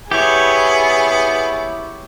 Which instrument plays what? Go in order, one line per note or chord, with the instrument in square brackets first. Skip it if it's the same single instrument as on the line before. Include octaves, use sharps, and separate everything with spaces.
[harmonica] B3 [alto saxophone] E4 [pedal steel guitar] G4 C#5 [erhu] G#4